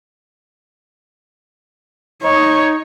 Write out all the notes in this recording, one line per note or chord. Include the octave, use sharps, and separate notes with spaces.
D#4 C#5